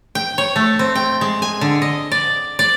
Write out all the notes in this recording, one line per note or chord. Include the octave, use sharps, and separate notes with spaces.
G5
C#5
A3
C4
G5
G#3
G#5
D3
D#5
D5
D5